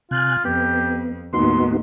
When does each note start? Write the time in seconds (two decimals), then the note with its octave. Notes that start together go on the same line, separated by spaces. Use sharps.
0.11 C3 F4 G#5 F#6
0.45 F2 B3 G4
1.33 D#2 A2 B3 D#4 F#4 C6